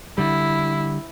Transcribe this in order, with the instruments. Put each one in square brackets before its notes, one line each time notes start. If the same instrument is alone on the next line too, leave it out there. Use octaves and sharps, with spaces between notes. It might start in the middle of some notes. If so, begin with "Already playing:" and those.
[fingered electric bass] D3 G3 [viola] E4